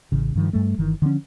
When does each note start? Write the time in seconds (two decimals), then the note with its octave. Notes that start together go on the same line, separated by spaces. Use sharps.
0.12 A1 C#3
0.35 G2 D#3 F3
0.53 G2 G3 A3
0.78 G1 D#3 E3
1.02 D3 F3 G#3 C#4